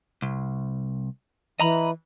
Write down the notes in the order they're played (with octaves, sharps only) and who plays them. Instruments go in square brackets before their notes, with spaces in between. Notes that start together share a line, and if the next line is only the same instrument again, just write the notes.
[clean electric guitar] C2
[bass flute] E3 [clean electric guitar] D#5 A#5 B5